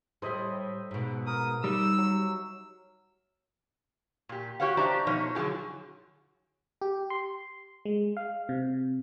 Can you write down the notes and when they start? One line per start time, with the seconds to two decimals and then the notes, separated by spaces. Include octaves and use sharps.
0.22 A2 G3 C5 D#5 E5
0.91 G#2 B2
1.27 A#4 D#6
1.64 G3 D#4 D5 E6
1.98 F#3
4.29 A#2 G4
4.60 F#4 G4 C#5 F5 F#5
4.77 D4 G4 C5 D5 E5 A#5
5.07 B2 F3 D#4 C#5
5.35 D3 F#3 D#4 G4 G#4
6.81 G4
7.10 C6
7.85 G#3
8.17 F5
8.49 C3